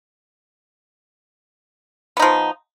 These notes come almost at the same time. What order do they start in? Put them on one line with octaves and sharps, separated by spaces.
B3 D#4 F3